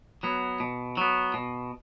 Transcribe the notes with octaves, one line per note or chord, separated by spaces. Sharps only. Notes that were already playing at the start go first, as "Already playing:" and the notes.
F#3 B3
B2
F#3 B3
B2